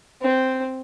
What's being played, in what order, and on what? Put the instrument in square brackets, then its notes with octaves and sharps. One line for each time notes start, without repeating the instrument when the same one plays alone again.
[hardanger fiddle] C4